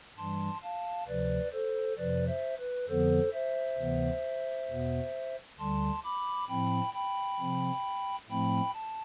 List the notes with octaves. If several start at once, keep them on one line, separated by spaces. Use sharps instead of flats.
G2 E3 G3 A5 C6
F5 A5
D2 C3 F3 B4 D5
A4 C5
F2 C3 F3 B4 D5
C5 E5
B4
F2 D3 F3 B3 A4 C5
C5 E5
D2 C3 E3 B3
E2 B2 B3
D2 D3 G3 A5 C6
B5 D6
A2 F3 C4 G5 B5
G5 B5
C3 F3 C4
A2 F3 A3 C4 G5 B5
A5